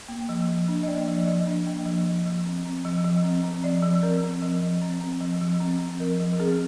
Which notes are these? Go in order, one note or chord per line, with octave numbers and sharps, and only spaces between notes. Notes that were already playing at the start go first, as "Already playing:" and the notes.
A#3
F3
F3
D4
D#5
A#3 D5
F3
F3 D#5
D4
A#3
F3
F3
F3
C4
C4
F3
F3
C4
C4
F3 D5
F3
C4 A#4
C4
F3
F3
C4
C4
F3
F3
C4
C4
F3 A#4
F3
A#4
C4 G#4